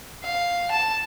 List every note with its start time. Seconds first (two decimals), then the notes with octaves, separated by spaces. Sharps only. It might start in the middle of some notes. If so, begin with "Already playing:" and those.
0.24 F5
0.71 A5